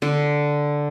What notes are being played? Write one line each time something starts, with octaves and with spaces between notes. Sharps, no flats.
D3